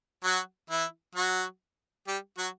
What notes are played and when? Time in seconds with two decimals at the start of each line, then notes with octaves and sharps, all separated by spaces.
0.24 F#3 F#4
0.70 E3 E4
1.16 F#3 F#4
2.08 G3 G4
2.38 F#3 F#4